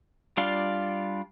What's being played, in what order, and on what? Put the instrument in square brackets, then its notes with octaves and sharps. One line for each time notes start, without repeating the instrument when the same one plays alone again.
[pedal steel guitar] G3 D4 F4 F5